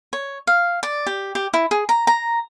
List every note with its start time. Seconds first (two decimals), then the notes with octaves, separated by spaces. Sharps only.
0.13 C#5
0.47 F5
0.83 D5
1.07 G4
1.35 G4
1.54 E4
1.71 G#4
1.89 A#5
2.07 A#5